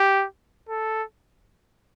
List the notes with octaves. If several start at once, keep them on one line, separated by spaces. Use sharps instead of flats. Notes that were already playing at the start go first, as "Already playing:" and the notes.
Already playing: G4
A4